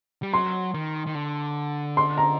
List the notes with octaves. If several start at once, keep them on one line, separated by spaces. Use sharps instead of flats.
G3
F#3 C6
D#3
D#3
D3
C6
A#5